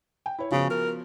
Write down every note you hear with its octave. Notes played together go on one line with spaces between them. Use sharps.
G5
E4 C#5
C#3 F3 B3 F#4
A#4